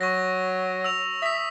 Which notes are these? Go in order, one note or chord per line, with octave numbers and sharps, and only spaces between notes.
F#3 C#6 A#6
E6 F7
E5 D#6 B6